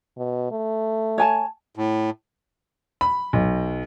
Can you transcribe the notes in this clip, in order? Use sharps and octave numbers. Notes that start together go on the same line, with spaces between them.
B2
A3
C#5 G#5 A5
A2
B5
B1